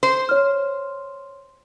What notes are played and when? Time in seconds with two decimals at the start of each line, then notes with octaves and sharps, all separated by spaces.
0.03 C5
0.29 C#5 F6